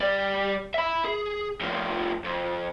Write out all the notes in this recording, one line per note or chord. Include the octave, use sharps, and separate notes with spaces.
G3 D5
E5 B5
G#4
A2 F3
F2